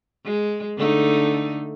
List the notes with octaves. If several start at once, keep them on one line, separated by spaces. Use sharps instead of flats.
G#3
D3 A3 D#4